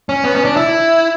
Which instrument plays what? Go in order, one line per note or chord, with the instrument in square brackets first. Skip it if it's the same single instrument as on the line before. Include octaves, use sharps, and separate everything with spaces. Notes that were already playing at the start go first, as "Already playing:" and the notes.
[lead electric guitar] C#4
B3
C#4
D4
E4